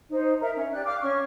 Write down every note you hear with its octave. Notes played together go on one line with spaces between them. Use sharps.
D#4 C5
A#4 E5 A#5
C#4
G4 D5 F#6
F5 G5 D6 F6
C#4 C#6